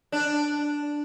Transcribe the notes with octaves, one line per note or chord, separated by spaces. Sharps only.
D4